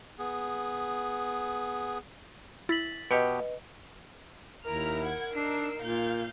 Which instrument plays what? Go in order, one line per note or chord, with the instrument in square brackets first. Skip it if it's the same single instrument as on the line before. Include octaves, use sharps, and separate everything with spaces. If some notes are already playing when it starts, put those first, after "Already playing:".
[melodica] B3 G#4
[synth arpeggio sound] E4 [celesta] A6 B6 F#7
[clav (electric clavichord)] B2 G4 [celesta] B4 D#5 [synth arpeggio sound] C#7
[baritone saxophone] D#2 [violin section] E4 A#5 F6 [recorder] A#4
[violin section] F#5 G#6
[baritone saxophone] D4 [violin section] D#4 E6 C7
[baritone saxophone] A#2 [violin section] F5 G6